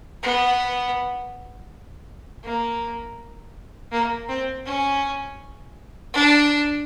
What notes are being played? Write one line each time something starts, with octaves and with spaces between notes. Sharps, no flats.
B3
A#3
A#3
C4
C#4
D4